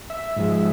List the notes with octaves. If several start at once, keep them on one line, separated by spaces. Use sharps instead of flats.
E5
G#2 F3 G#3